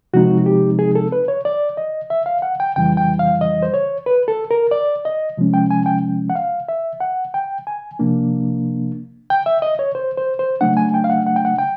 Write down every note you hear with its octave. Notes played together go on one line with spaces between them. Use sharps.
C3 F3 G#3 C4 D#4 F#4
G4
G#4
A4
B4
C#5
D5
D#5
E5
F5
F#5
G5
F2 C#3 E3 G3 G5
G5
F5
D#5
C5
C#5
B4
A4
A#4
D5
D#5
C3 F3 G#3 C#4
G5
G#5
G5
F#5
F5
E5
F#5
G5
G#5
C3 F3 A#3 D4
G5
E5
D#5
C#5
C5
C5
C5
C#3 F#3 A3 D4 F#5
G#5
G5
F5
F#5
F#5
G5
F#5
G5